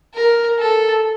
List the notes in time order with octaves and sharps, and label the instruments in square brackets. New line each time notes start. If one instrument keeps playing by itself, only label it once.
[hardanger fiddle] A#4
A4